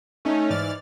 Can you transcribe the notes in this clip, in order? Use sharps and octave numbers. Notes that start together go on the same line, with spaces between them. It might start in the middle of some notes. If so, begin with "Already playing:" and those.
A3 C#4 D#4
G#2 E3 D5 F6 A6